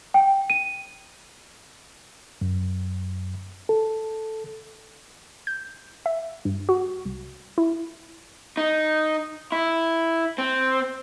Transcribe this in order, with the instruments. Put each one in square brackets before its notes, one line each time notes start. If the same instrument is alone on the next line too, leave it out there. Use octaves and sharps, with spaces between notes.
[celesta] G5
D#7
[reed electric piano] F#2
A4
[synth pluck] G6
E5
G2
F#4
C2
E4
[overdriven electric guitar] D#4
E4
C4